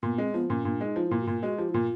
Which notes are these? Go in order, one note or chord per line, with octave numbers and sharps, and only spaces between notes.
A#2 B3
G#3 C4
F3 B3
A#2 C#4
A#2 D4
G#3 D#4
F3
A#2 E4
F#4
A#2 F4
G#3 F#4
F3 G4
E4
A#2 F4